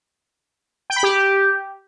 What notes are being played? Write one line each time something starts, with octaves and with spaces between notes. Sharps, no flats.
G5
B5
G4